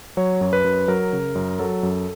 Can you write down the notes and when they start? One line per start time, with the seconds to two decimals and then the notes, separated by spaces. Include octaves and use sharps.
0.17 F#3 C#5
0.41 F#2
0.53 B4
0.65 F#2
0.88 F#3 A#4
1.13 C#3
1.35 F#2
1.59 F#3 A4
1.83 F#2